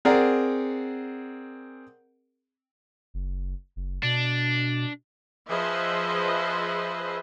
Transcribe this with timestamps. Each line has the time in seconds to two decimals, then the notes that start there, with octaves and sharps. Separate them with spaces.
0.05 C4 G#4 A#4 D5 F#5
3.14 F#1
3.76 F#1
4.03 B2 D4
5.49 F3 G#4 B4 C5 D#5 E5